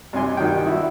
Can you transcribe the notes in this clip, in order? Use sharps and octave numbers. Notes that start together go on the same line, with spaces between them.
G2 C3 G#5 C6
G2 D#3 F#4 G5
E4 F#4